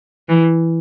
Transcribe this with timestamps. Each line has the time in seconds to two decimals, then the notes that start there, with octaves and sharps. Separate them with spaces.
0.29 E3